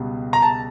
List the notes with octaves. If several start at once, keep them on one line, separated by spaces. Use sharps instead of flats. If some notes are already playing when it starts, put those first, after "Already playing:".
Already playing: C#2 B2 G3
A#5
A5